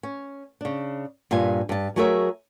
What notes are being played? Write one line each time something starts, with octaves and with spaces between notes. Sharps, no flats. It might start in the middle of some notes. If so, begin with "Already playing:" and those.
C#4
C#3 D4
G2 A#2 F4 E5 G#5
G2 A5
F#3 A3 G#4 A#4 C#5 E5